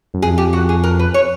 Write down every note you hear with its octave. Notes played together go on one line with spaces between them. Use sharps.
F#2
F2 G#4
G4
F#4
G#4
A#4
B4
C#5